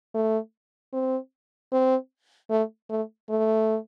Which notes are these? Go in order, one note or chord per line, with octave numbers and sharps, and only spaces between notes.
A3
C4
C4
A3
A3
A3